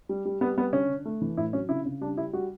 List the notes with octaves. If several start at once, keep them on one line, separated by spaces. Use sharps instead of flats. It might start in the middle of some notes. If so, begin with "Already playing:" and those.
G3
G3
G3 B3
G3 B3
D3 C#4
D3
A3
E3
A2 E4
F#3 C#4
C#3 E4
C#3
G3 D4
G3 E4
G3 F#4